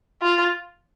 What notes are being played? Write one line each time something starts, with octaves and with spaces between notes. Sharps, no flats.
F4